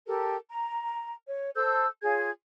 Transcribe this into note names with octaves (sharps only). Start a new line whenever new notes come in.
G4 A4 A#4
A#5
C#5
A4 C5 E6 G6
F4 G#4 C#5 G#6